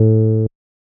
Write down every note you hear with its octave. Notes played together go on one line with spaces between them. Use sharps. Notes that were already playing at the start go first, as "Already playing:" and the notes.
Already playing: A2